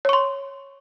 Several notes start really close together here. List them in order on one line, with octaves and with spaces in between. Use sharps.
C#5 C#6 C6